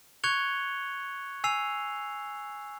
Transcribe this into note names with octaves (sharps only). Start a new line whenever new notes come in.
C#6 F#6 G#6 C#7 F7 G7
G#5 E6 C7 F7